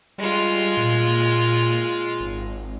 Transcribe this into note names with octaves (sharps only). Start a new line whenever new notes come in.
G3 G#3 F4
A#2
G#1